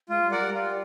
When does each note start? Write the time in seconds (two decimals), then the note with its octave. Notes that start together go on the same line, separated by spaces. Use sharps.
0.09 G#3 F4
0.24 G3
0.32 A#4 D5 F#5
0.39 G3
0.53 F4